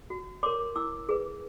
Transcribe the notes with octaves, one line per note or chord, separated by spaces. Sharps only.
F#4
A#4 C#5 C6 D6
E4 D6 E6
G#4 B4